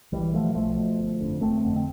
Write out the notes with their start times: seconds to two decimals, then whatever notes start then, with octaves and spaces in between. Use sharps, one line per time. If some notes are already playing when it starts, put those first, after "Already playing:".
0.12 B1 E3 G3
0.34 B2 F3 A3
0.55 B1 F3 A3
0.76 B2
0.99 G1
1.20 F2 D3
1.41 G1 A3 C4
1.64 F2 D3
1.76 C4